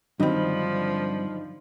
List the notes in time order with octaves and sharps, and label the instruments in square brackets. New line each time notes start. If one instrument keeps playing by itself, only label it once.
[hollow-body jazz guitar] G2 C4 [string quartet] D3 F3 [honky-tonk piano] D#3 [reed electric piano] F#3 D#5 B5